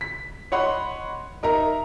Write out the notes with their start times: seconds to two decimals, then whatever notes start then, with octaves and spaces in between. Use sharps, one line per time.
0.01 B6
0.52 C#5 D#5 F#5 B5 C6
1.43 D#4 A#4 E5 A#5